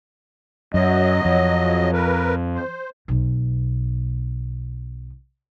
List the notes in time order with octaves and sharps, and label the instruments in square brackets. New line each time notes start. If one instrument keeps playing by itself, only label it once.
[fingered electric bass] F#2 [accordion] F#3 D#5
[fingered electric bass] F2
[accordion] A#4 B4
C5
[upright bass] B1 B2